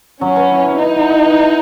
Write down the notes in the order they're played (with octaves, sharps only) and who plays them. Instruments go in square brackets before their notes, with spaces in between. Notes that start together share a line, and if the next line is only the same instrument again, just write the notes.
[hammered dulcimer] F#3 [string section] C#4
[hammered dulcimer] B4
E4
F#3
[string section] D#4 [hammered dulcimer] B4
[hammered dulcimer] E4
B4
B4
E4